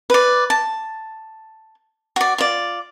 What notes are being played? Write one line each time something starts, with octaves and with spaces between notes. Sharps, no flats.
B4 D5
A5
F#4 D5
F4 D5